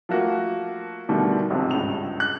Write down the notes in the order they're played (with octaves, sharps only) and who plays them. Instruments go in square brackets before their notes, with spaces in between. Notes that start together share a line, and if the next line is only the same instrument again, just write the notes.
[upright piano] F3 A3 A#3 F#4
B2 D3 D#3 G3 A3
B1 F2 G#2 C3
C#2 G2 F7
F#6